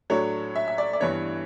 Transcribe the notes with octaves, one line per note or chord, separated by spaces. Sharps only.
A2 F#3 A3 D4 C#5
E5
E5
D5
D5
G2 E3 B3 D4 C#5